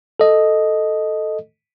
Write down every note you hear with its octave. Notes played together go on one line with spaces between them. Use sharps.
A4 D#5